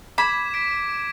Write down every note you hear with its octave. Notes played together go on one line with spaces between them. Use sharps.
B5 D6 G#6 E7
B6 D7